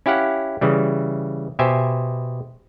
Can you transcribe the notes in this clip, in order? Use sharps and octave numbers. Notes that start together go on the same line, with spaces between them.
C#4 E4 G4 F5 F#5
C#3 E3 G3
B2 G4 C5 E5 G#5